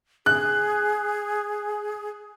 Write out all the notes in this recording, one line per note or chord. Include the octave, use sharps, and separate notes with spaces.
G#4 F#6